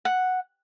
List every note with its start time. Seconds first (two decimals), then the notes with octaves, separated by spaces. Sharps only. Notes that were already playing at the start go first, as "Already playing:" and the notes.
0.05 F#5